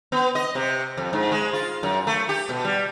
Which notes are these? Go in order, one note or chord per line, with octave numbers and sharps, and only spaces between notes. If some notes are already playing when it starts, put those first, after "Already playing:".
B3
D#5
C3
F2
G#2
G#3
F4
F#2
A3
G4
B2
G3